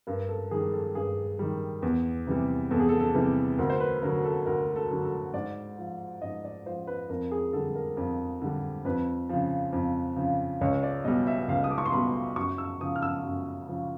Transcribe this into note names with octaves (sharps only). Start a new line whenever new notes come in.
G2 A#4
A4
D#3 G3 G#4
A4
G2 G#4
D#3 G3
E2
C3 E3 G3
E2 A4
G#4
A4
A4
C3 E3 G3
D2 A#4
C5
B4
D3 F#3 A#4
A4
D2 A#4
A4
D3 F#3
A4
G#2 D5
F3
G#2 D#5
D5
F3 C5
B4
F2 A#4
G#4
D3 G3 A4
A#4
F2
D3 G3
F2 B4
C#3 F3
F2
C#3 F3
C#2 C#5
D5
B2 G3 D#5
E5
C#2 F5
D#6
D6
C#6
C6
B2 G3 B5
F#2 C#6
E6
C#3 F3 D#6
F6
E6
F#2
C#3 F3